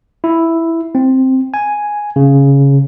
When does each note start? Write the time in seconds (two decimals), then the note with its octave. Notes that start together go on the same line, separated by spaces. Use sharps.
0.24 E4
0.95 C4
1.54 G#5
2.16 C#3